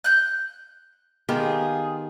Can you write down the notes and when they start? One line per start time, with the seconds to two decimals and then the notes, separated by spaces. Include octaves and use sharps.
0.04 F#6 G6
1.29 D#3 B3 F4 G4 G#4